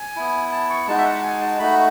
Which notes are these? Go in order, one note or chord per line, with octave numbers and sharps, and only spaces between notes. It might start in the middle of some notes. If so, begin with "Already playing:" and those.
Already playing: G#5
B3 E4
A5
C#6
G#3 D#4 F#4 A5
E5
F#5
A5
G#5
A5
A3 D#4 F#4 B5